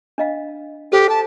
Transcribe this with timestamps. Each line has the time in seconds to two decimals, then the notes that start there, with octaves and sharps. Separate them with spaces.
0.18 D4 D#5 F5
0.92 G4 A4 C5 D#6
1.09 A5